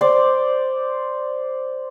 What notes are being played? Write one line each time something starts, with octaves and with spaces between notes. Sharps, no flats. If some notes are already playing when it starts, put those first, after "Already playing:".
C5 D5